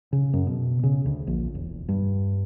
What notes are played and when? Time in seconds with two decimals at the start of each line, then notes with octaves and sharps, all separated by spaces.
0.13 C#3
0.33 F#2
0.47 B2
0.83 C#3
1.06 D2
1.27 A#1
1.55 E1
1.89 G2